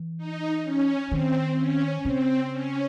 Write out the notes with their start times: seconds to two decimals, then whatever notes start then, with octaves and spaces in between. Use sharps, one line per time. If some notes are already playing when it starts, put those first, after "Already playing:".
Already playing: E3
0.18 D#4
0.64 C#4
1.11 D#3 C4
1.58 C#4
2.05 C#3 C4
2.53 C#4